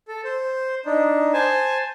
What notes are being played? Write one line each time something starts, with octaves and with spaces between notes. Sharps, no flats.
A4
C5
D4 D#4
C5 G#5 A5